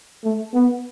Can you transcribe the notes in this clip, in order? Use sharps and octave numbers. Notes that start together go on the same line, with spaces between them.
A3
B3